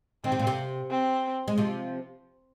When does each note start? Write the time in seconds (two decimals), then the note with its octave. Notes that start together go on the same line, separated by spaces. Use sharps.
0.24 D#3 C4
0.32 C3
0.39 A#2
0.47 C3
0.91 C4
1.48 G#3
1.58 C3 F3